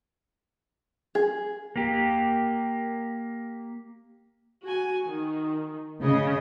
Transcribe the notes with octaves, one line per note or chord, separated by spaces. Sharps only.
G#4
A#3 G4
F#4 G#5
D#3
C#3 D#5